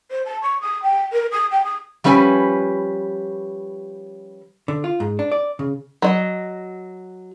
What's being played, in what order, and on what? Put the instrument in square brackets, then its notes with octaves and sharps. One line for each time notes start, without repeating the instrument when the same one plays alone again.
[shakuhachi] C5
A5
C#6
D#6
G5
A#4
D#6
G5
D#6
[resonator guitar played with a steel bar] F3 G3 C#4 B4 G#5
[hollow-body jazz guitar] D3
F4
G#2
D4
D5
C#3
[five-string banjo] F#3 D#5